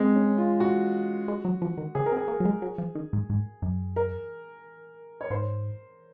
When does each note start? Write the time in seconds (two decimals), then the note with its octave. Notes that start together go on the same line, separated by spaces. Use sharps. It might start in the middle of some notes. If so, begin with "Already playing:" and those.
Already playing: G#3 C4
0.15 C#4
0.38 F4
0.60 F#4
1.28 G#3
1.45 F#3
1.62 F3
1.77 D#3
1.95 C#3 G#4
2.06 A#4
2.12 C4
2.17 G#4
2.28 A#3
2.40 F#3
2.45 G#3
2.62 F#3
2.78 F3
2.95 D#3
3.13 G#2
3.30 G#2
3.62 F#2
3.96 A#4
5.21 C#5
5.30 G#2 C5